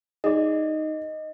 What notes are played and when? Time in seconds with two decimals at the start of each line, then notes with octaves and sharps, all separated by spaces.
0.24 D#4 G#4 D5 D#5